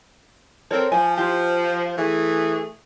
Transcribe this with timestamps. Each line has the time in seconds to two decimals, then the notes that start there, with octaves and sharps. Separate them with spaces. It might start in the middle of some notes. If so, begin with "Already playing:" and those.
0.71 C4 A4 A#4 C#5
0.92 F3 G#5
1.18 F4 G4
1.97 E3 A3 G#4